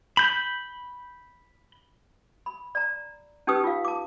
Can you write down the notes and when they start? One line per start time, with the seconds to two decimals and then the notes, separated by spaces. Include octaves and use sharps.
0.17 B5 G6
2.46 B5
2.75 D5 A#5
3.47 C#4 D#4 G4 B4 D#6 E6
3.64 F4 F5
3.85 A5 D6